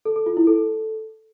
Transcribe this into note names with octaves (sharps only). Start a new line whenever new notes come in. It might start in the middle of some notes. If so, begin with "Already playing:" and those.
A4
A4
F4
E4
A4